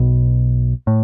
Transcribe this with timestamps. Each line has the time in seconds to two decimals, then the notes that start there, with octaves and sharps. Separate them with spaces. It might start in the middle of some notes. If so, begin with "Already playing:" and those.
Already playing: B1 B2
0.87 A2